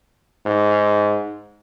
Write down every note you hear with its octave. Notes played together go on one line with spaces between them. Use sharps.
G#2